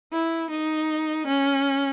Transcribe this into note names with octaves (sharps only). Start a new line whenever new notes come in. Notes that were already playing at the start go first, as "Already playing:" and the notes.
E4
D#4
C#4